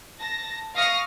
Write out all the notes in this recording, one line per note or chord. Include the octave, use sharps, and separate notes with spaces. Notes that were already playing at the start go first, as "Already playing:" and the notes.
A5 A#6
F5 C#6 D#6 F6 A#6